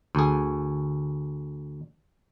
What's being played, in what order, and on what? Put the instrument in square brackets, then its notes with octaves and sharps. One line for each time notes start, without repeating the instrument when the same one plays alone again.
[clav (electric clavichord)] D2 G#4